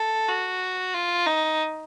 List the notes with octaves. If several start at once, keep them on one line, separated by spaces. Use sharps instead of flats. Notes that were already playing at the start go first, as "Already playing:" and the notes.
Already playing: A4
F#4
F4
D#4